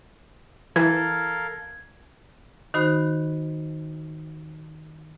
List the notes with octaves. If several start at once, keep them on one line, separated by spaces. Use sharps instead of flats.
E3 A4 A#4 F5 G#6
D#3 D#4 F#4 C5 B5 F#6